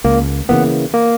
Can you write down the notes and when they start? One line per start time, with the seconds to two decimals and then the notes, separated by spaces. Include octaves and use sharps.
0.05 C#2 A#3
0.49 C#3 E3 A#3 B3
0.94 A#3